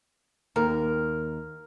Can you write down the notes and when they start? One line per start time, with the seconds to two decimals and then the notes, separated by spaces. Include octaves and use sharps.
0.56 D#2 A#4